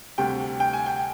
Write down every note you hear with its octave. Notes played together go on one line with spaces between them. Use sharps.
D2 C3 G3 G5
G5
G#5
G5